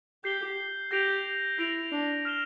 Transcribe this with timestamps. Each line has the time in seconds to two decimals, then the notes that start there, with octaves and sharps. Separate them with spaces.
0.24 G4 G6 C7 G7
0.91 G4 G6 A#6 D7 F7
1.58 E4 G6 A#6 D7 F7
1.92 D4
2.25 F6 A#6 E7 G7